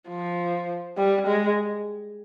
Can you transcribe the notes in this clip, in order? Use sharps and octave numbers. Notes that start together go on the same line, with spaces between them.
F3
G3
G#3